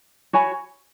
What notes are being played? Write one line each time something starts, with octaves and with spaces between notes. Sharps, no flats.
F#4 C#5 G#5 B5